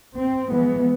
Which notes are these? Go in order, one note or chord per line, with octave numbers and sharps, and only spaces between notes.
C4
E3 F3 G#3 B3